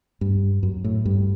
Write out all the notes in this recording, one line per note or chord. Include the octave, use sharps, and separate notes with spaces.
G2
F#2
A2
G2